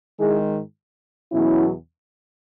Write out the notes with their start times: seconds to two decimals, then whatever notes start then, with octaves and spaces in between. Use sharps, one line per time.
0.20 G#2 D#3 G#3 E4 G#4
1.32 E2 B2 F#3 C#4 E4